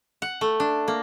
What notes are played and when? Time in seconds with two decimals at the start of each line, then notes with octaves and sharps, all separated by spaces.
0.22 F#5
0.41 A3
0.60 D4
0.88 A#3